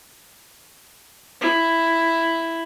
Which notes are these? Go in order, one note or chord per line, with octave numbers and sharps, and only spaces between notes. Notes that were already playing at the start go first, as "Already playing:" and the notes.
E4